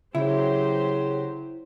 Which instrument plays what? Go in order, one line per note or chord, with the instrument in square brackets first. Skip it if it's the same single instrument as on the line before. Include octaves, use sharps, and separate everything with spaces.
[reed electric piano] C#3 [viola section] F#3 G4 C5 [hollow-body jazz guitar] E4 [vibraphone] G#4 C#5